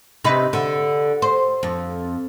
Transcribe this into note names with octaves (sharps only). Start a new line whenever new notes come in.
C3 D#4 B4
D3
C5
F2